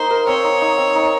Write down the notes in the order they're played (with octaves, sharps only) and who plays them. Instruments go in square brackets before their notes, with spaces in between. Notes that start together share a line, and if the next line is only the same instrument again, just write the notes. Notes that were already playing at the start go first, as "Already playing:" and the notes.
Already playing: [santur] A#3 D#4 D#5 [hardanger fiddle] C5
[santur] A#4
[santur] C4 [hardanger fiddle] C#5
[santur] D#4
D#4
C4
D#4